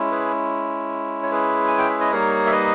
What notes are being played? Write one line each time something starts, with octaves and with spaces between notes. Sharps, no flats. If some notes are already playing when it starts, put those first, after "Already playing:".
Already playing: G#3 C#4 E4
G#4 B4
C#5
G#4 B4
G#5
G5
E5
D#5
G3 A#3 D#4 A#4 C#5
E5
B4 D#5